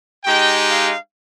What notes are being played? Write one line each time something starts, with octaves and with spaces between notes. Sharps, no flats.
G#3 D#4 G4 G5
F5